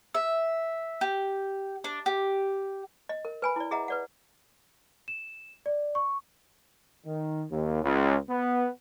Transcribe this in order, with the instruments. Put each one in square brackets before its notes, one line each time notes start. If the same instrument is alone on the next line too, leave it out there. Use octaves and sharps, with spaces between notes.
[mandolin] E5
G4
D4
G4
[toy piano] D#5
A#4
B4 G#5 B5
E4 D5
G#4 D#5 E5 F#5 A#5
B4 D5 F#5
[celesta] E7
D5
C#6
[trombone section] D#3
D#2
C#2
B3